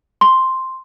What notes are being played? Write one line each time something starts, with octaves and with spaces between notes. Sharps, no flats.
C6